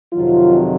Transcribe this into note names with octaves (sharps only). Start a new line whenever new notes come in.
F2 C3 D#3 F#3 F4